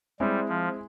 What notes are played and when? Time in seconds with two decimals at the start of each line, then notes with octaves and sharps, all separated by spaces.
0.20 G3 G#3 C4 E4
0.49 F3